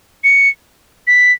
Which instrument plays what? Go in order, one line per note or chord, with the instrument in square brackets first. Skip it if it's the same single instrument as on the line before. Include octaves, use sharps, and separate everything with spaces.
[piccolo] C#7
B6